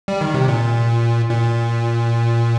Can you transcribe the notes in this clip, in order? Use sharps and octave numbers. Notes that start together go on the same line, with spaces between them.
G3
D#3
C3
A#2
A#2